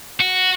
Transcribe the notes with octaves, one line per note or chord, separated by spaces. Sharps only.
F#4